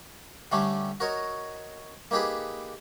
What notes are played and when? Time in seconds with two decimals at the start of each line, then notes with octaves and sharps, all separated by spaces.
0.52 D3 G3 A3 C#4 D4
1.00 F#4 A#4 C#5 D#5
2.11 A#3 D#4 G4 G#4 B4